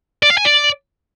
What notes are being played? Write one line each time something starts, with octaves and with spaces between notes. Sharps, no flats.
D5
F5
G#5
D5